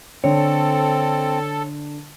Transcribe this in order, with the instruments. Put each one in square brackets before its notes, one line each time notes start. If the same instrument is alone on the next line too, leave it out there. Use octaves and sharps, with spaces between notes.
[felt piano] D3 [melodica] C4 [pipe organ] A4 [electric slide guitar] C#5